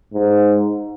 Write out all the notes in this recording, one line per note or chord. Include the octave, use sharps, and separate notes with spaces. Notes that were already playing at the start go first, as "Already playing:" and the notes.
G#2